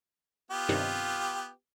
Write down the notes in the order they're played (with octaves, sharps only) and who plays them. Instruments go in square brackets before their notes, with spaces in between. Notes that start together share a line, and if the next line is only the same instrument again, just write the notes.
[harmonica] B3 F4 G4
[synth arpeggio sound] G2 C3 D#3